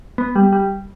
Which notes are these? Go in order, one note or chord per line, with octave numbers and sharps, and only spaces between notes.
B3
G3
G3